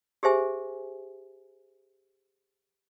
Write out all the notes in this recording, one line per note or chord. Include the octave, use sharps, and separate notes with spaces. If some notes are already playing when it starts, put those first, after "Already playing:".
G4 G#4 C5 E5 G#5